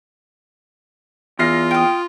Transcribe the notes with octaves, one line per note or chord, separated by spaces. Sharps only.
E2 F4 F6 A#6 C7
G5 D#6